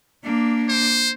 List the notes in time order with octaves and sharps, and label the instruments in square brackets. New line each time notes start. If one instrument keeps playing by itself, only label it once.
[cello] A#3 D4
[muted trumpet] C5